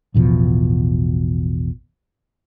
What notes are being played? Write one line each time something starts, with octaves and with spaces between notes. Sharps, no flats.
A1 E2 B2 F3